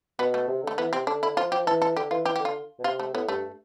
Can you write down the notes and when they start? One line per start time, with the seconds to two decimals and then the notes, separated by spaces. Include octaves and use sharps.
0.19 B2 B3
0.34 A3
0.48 C3
0.63 D3 A3
0.78 E3 B3
0.93 C3 C4
1.07 D3 D4
1.23 D3 E4
1.37 F3 F4
1.52 F3 G4
1.67 E3 A4
1.82 A4
1.96 D3 G4
2.11 E3 F4
2.25 E3 G4
2.36 G4
2.40 D3
2.45 F4
2.79 B2
2.84 C3 F4
3.00 A3
3.13 A2 B3
3.28 G2 A3